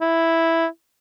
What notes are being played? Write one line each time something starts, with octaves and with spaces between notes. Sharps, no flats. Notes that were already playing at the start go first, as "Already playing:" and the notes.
E4